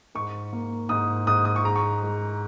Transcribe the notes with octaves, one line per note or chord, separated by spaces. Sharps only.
G#2 C#6
A#3
G#2 D#6
G#2 D#6
D#6
C#6
G#3 A#5
C#6
G#3